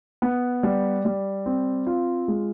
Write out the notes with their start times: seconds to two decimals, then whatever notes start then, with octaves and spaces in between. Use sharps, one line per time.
0.22 B3
0.63 G3
1.05 G3
1.46 C4
1.87 F4
2.28 G#3